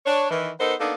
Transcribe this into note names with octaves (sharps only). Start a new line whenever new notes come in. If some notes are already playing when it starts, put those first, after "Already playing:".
D4 C#5
D#3 E3
B3 D#4 A4 A#4 C5
A#3 B3 D4 D#4 A4